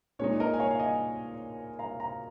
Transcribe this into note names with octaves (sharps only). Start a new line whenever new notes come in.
A#2 G#3 D#4 C#5
A#4 D#5
G#5
C#5 F5
F5
D#5 G#5
F5 A#5
F5 A#5